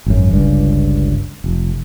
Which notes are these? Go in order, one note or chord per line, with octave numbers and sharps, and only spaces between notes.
G#1 F#2
G1 C#2 G2
F1